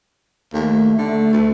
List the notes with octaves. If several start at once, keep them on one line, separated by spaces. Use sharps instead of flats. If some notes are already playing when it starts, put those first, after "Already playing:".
D#2 A3
D3
D2